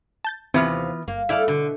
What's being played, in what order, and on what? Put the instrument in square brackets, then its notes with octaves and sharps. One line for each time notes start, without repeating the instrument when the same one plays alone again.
[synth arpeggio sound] A5 G6 A6
[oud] D#2 C3 [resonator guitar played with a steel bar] E3 B3 F4 [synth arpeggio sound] C4 C5 F5
[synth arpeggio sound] G1 [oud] A#3
[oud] A3 A4 [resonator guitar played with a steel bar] E4 D5 F5 [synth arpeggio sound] E5
[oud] B2 [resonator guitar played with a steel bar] D3